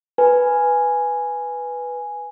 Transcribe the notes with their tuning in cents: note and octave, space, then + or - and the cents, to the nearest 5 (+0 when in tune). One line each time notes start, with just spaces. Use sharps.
B4 +0 G#5 +0